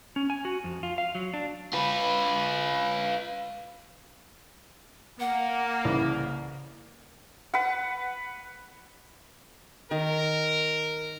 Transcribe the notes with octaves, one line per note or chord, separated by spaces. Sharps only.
C#4
G#5
F#4
F2
F4
F5
F#3
D4
F4 B4
A#3 F#5
C2 C#3 E3
B4 F#5
D#3 A#4